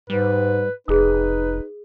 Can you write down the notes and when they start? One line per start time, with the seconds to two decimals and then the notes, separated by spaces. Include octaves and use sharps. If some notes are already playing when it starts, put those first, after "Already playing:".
0.10 G#2 G3 B4
0.88 F1 D#4 G#4 B4 D#6